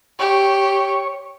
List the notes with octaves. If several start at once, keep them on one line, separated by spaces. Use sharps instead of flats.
G4 C#5 C#6